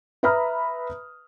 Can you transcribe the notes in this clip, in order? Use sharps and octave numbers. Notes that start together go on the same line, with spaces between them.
B4 E5 A#5 B5 D#6 F6